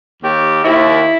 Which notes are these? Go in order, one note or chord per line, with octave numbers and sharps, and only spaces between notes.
D#2 G4
D#2 E4